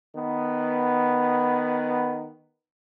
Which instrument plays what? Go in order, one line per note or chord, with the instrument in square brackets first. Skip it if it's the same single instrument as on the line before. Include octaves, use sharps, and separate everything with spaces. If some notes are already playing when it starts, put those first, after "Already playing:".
[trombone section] D#3 B3